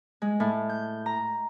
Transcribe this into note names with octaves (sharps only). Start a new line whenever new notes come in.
G#3
A2
G6
A#5